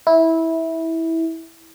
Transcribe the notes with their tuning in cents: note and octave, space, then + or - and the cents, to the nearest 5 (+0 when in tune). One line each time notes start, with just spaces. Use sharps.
E4 -15